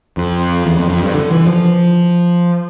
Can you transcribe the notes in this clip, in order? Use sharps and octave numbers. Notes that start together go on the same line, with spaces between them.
F2
E2
F2
F2
G2
D3
E3
F3